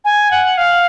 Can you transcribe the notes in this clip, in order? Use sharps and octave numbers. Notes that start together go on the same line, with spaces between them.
G#5
F#5
F5